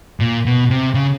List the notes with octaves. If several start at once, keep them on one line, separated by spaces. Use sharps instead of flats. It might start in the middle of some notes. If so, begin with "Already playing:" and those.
A#2
B2
C3
C#3